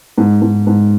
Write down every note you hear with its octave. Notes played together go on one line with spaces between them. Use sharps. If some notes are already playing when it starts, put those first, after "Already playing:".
G#2
G#2
G#2